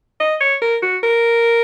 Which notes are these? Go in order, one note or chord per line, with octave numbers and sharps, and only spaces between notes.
D#5
C#5
A#4
F#4
A#4